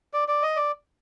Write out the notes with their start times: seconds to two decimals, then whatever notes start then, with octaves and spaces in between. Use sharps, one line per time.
0.13 D5
0.28 D5
0.42 D#5
0.56 D5